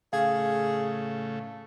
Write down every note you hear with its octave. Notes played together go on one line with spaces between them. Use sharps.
A2 C#3 A3 G#4 F5